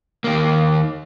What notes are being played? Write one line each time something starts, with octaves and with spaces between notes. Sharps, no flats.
D#2 A#3